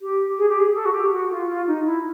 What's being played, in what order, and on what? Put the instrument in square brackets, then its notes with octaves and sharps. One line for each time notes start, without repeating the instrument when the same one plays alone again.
[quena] G4
G#4
G4
G#4
A4
F#4
G4
F#4
F4
F4
D#4
E4